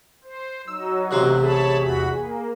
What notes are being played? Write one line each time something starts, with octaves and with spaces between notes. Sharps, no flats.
C5
F#3 D#4 E6
A1 C3 C4 F#6
G#4 C#5 A5 B5
E2 F#4 B5
A#3